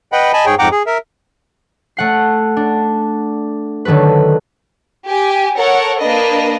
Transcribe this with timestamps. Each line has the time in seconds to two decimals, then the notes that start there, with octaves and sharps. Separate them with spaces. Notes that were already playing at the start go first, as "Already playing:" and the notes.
0.12 B4 D#5 F#5 G5 B5
0.33 D#5 G#5 A5 B5
0.46 G#2 G#4 C#5 G5
0.59 F2 G#2 F#5 G5 A#5 D6
0.72 G#4
0.86 A#4 E5
1.97 A3 F#5 C7
2.57 D4
3.85 D3 D#3 F#3 A4 B4
5.06 G4 G#5
5.58 A4 A#4 C#5 F#5
6.01 A#3 D4 B4 D#5